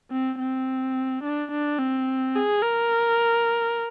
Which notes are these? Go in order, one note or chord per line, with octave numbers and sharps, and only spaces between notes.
C4
C4
D4
D4
C4
G#4
A#4